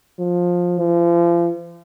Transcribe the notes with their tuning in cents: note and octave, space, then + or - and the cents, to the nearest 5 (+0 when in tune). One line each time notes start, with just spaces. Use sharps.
F3 +15
F3 -35